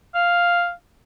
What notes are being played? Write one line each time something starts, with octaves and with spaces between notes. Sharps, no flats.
F5